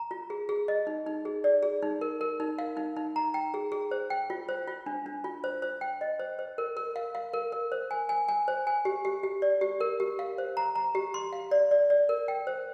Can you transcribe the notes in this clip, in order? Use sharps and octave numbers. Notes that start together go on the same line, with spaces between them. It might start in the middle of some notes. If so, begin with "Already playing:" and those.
Already playing: A#5
F4
G#4
G#4
D#5
D#4
D#4
G#4
D5
G#4
D#4
A#4
A#4
D#4
F5
D#4
D#4
A#5
G5
G#4
G#4
C5
G5
F4
C5
F4
D4
D4
F4
C5
C5
G5
D#5
C5
C5
A#4
A#4
F5
F5
A#4
A#4
C5
G#5
G#5
G#5
C5
G#5
G4
G4
G4
D5
G4
A#4
G4
F5
C5
A#5
A#5
G4
C6
F5
D5
D5
D5
A#4
G5
C5